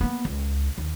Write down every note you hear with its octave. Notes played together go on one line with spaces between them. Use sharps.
A#3 B3
C#2
D#2